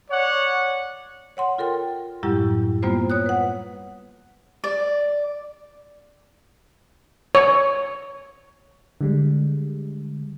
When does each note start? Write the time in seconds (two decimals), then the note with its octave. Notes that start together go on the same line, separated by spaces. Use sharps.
0.10 C#5 D5 F#5
1.37 C#5 F#5 C6
1.58 F4 A4 A#4 G5
2.23 F#2 A2 F#3 G3 E4 G4
2.83 G3 A#3 B3 F4 C5
3.10 C#5 D#6 F#6
3.26 B4 F#5
4.64 D5
7.35 C#5
9.01 D3 G3 G#3